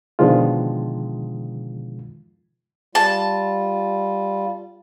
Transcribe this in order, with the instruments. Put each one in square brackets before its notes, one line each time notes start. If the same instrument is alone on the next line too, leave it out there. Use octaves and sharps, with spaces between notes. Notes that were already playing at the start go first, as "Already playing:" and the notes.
[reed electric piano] B2 D3 D#3 F3 G#3 F4
[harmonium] G3 F4 [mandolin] A5